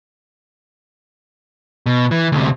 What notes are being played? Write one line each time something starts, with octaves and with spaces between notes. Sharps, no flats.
B2
E3
D2 C3